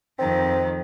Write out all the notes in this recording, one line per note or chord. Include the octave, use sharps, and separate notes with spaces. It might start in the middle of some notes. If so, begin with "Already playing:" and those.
F2 D#3 C4